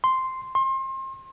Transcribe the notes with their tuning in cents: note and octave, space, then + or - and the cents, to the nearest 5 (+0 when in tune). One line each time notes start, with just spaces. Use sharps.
C6 -5
C6 +30